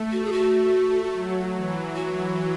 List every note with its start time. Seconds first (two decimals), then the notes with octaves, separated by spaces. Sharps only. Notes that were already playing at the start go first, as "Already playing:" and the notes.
Already playing: A3
0.12 F#4
0.25 G#4
0.32 F#4
1.14 F#3
1.55 E3
1.96 F#4